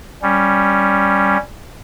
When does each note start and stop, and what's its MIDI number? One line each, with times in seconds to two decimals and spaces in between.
0.23 1.37 55
0.23 1.37 61